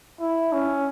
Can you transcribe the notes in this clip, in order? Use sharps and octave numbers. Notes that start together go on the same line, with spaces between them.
E4
C#4